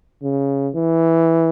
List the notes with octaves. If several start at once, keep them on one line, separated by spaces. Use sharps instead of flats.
C#3
E3